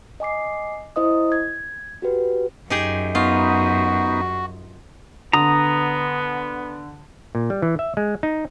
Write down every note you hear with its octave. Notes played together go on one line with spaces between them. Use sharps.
D#5 G#5 D6 C7
E4 C5 D#5 D#6
G#6
F#4 G4 B4
F#2 D#4 G4 G#4
B3 D#4 F4 F#4
D3 B3 A#5 D#6
A#2
G3
E3
E5
G#3
D#4